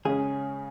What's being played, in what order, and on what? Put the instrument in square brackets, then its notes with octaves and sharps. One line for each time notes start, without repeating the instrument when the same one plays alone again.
[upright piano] C#3 G#3 C#4 [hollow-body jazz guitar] G#4